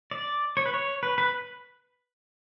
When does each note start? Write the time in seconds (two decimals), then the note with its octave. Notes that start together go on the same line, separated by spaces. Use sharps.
0.11 D5
0.57 C#5
0.66 B4
0.74 C#5
1.03 B4
1.18 B4